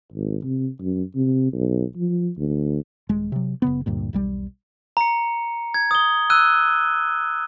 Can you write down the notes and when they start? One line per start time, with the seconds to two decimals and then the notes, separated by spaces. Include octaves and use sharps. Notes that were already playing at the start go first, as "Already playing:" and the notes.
0.12 G#1
0.43 C3
0.80 F#2
1.15 C3
1.53 B1
1.96 F3
2.37 D2
3.09 D#1 G#3
3.32 C3 F#3
3.62 F#1 C#3 B3
3.86 D2 G2 A#2
4.13 E1 B1 G3
4.97 A#5 C#7
5.74 G#6
5.91 D#6 G7
6.30 E6 F#6 D#7